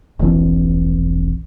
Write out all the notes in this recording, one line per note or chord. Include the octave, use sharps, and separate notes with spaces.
E1 A#1 E3 C4